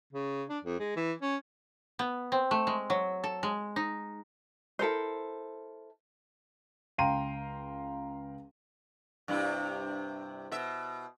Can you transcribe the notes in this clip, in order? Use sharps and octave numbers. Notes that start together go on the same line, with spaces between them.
C#3
D4
F2
G#3
E3
C#4
B3
C4
A3
G#3
F#3
A4
G#3
D#4
E4 A4 A#4 C5
C#2 F5 G5 A#5 C6 D#7
G2 C3 E4
B2 E5